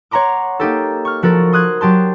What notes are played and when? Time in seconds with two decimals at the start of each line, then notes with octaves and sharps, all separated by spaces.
0.11 C#5 F#5 A#5 C6 D6
0.60 A#3 D#4 G4 A4
1.05 C#6 F6
1.23 F3 F#4 A4 A#4
1.52 C6 D#6 F#6 G#6
1.81 F#3 G4 A5 C6